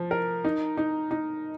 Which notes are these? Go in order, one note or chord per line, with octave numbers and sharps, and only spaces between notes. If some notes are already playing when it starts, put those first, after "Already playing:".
Already playing: F3
A#4
D#4
D#4
D#4